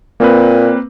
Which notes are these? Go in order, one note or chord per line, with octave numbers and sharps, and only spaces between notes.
A#2 A#3 C4 B4